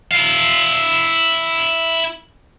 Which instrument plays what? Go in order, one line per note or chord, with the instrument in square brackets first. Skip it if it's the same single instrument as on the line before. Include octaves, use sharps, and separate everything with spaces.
[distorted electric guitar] E4 F5